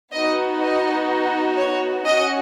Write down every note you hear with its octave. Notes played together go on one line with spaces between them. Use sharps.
B3 D#4 F#4 D#5
D#5
C#5
C#4 F#4 D#5